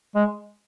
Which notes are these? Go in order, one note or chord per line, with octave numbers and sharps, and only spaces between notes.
G#3